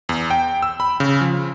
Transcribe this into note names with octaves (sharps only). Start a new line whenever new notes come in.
E2
G5
E6
B5
C#3
F3